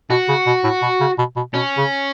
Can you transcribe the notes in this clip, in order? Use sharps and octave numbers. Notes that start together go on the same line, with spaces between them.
B2 F#4
C#3
B2
A2
B2
C#3
B2
B2
B2 C#4
C#3